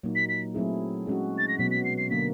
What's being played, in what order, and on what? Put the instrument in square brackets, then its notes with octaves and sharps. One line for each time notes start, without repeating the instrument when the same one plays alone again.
[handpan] A#2 F#3 A#3 D#4
[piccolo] B6
B6
[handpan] F#3 A3 C4 E4 G#4
G#3 C#4 F#4
[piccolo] A6
A#6
[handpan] B2 F#3 B3 [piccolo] B6
[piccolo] B6
C7
C7
[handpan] D3 F#3 A#3 D4 [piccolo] B6